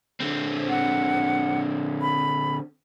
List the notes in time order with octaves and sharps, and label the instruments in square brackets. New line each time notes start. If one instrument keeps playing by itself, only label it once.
[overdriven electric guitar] D3 C4
[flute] F#5
B5